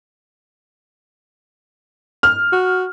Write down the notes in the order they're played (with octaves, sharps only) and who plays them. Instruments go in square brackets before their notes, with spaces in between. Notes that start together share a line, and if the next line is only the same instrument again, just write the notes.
[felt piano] F6
[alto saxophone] F#4